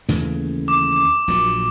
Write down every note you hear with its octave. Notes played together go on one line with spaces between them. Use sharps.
D#2 C#3 E3 A3
D6
A#1 A#2 F#3